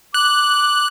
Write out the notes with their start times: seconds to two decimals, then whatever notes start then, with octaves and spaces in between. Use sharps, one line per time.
0.14 D6 F#6